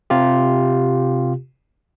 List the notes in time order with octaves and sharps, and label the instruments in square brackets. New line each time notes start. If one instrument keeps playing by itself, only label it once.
[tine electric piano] C3 F4 G4